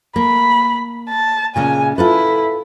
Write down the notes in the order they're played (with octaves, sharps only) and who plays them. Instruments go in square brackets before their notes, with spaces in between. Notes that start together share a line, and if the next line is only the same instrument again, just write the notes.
[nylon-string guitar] A#3 [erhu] B5
[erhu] A5
[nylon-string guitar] A#2 C#3 G#3 [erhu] G#5
[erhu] E4 [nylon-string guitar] F4 A4 B4